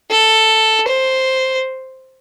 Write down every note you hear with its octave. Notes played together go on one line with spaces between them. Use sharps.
A4
C5